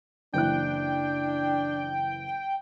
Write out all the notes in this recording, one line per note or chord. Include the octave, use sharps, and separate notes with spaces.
F#1 E3 D4 G5 F#6